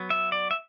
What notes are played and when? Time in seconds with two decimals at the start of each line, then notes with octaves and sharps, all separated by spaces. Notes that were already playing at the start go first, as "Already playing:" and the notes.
Already playing: F#3 B3
0.10 E5
0.32 D5
0.51 E5